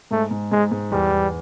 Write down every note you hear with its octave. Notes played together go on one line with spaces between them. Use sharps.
G#2 A3
G#2
G#2 G#3
G#2
E2 G3
E2